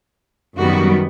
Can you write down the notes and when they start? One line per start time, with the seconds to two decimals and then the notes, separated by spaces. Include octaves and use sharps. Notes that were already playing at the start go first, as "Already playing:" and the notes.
0.56 F#2 D#3 G3 B3 F#4